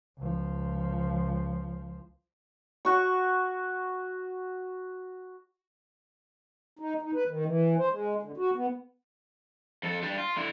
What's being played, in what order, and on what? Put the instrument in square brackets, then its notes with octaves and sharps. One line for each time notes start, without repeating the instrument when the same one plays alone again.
[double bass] C#2 F3
[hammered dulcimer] F#4 C#6
[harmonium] D#4
D#4
B4
D#3
E3
C5
G#3
D3
F#4
B3
[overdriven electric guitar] F2 A4
G3 D4
F4
D3 E4